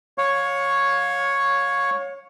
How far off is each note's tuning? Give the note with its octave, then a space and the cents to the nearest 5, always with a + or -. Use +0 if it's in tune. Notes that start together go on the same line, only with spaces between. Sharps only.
C#5 +0 F5 +35 C#6 +0